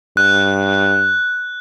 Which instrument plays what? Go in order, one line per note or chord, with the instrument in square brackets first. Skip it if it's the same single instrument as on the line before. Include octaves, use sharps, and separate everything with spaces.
[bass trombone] G2 [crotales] F#6